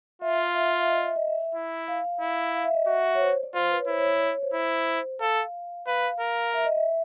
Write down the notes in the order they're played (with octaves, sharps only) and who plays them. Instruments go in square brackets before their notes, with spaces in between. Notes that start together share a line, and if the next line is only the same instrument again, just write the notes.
[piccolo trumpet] F4 [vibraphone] E5
[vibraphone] F5
E5
F5
E5
D#5
E5
D#5
E5
[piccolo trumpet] E4
[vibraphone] F5
F5
[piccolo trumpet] E4
[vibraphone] F5
E5
D#5
[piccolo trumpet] F#4 [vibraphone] E5
[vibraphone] C#5
C5
D5
[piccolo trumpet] F4 [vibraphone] C5
[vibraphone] B4
C#5
[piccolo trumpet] E4 [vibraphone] C5
[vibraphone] C#5
C#5
D5
C#5
C5
[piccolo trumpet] E4
[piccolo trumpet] A4 [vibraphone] F5
[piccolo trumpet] B4 [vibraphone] F5
[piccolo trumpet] A#4
[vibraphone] E5
D#5
E5